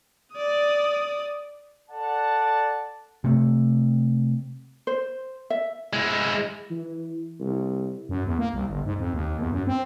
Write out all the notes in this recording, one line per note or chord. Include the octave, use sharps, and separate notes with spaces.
D5 D#6
A4 D5 F#5 A5
C3 A3
C5
E5
G#3 E4
E3
C2
F#2
E2
A#3
C2
G1
G#2
F2
D#2
E2
F#2
C4